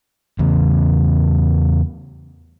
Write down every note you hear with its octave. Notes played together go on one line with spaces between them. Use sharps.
E2 C#3